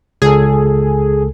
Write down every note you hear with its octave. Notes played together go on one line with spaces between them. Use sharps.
C#2 G#4 A4